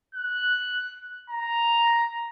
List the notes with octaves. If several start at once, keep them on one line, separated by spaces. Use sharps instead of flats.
F#6
A#5